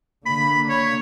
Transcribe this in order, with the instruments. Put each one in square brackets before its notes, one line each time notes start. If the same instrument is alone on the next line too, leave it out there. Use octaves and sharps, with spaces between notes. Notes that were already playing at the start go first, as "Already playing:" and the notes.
[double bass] D3 A#3 [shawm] B5
[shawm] C#5